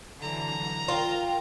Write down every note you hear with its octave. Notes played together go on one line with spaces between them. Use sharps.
D3 E3 F#3 A#5
F4 A#4 G5